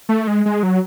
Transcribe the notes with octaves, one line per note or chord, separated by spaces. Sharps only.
A3
G#3
G#3
F#3